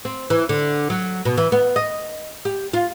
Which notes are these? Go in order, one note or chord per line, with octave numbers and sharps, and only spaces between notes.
C4
E3
D3
F#3
B2
E3
B3
D#5
G4
F4